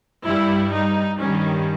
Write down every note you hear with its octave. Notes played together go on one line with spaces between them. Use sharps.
G2 G3 E4
D#4
G2 D#3 G3 C#4